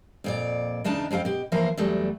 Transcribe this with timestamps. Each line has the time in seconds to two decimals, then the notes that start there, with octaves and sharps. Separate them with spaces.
0.24 F2 A#2 D5
0.84 E2 C#3 D4 D#4 A5
1.11 F2 C4 G#4 F5 G5
1.25 B2 G4
1.52 E3 F3 A#3 A#4 C5
1.77 E2 F#3 G3 A3